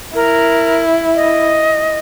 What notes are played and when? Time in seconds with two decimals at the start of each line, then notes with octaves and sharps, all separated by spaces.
0.15 E4 A#4
1.16 D#5